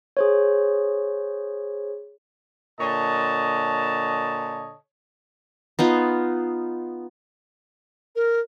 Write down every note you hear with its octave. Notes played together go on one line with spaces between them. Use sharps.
G#4 C5 C#5
A#2 D3 C#5 D#5 A5
B3 D#4 F4
A#4